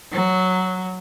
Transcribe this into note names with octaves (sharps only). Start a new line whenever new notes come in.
F#3